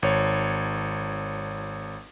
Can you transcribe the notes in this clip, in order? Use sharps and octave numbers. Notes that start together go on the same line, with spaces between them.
G#1 C#5